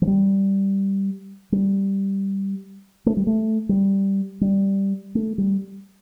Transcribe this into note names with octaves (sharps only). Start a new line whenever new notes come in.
F3
G3
G3
A3
G3
A3
G3
G3
A3
G3